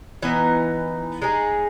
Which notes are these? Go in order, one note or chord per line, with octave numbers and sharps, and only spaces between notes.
E3 B3 D#4
G#3 D#4 G#4